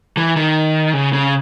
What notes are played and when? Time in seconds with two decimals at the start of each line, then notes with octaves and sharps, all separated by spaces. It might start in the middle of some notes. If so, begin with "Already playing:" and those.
0.17 E3
0.36 D#3
0.93 C#3
1.13 C#3